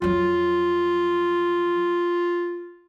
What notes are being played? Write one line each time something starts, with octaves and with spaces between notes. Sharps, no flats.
F2 F#3 F4